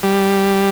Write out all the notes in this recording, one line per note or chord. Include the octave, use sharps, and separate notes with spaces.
G3